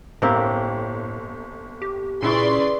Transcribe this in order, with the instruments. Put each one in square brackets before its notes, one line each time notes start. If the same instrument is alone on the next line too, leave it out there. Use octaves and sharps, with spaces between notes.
[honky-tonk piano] G1 [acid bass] A2 [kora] A#3 C4 G4
[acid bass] G4
[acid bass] A#2 [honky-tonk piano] C#3 E4 C#6 [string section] B4 D5 C6